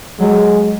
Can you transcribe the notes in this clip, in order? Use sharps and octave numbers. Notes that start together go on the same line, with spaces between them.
F#3 G#3